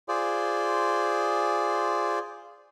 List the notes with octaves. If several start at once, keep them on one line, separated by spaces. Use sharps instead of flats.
F4 G#4 C5 D5